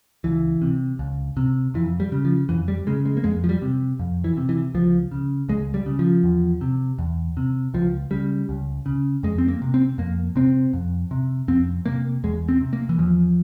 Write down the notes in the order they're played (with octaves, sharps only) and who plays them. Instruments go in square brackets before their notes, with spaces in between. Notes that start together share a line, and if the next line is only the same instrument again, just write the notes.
[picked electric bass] C#2 E3
C3
C#2
C3
F2 E3
G3
C#3
F3
F2 E3
G3
C#3 G#3
G#3
A#3
F2 G#3
F3
G3
C3
F2
E3
C3
E3
C#2 F3
C#3
C#2 G#3
G3
C#3
F3
E2
C3
E2
C3
C#2 F3
C#3 G3
C#2
C#3
F2 G#3
C4
A#3
C3
C4
F2 A#3
C3 C4
F2
C3
F2 C4
C3 A#3
E2 G#3
C4
C3
A#3
E3
E2 F3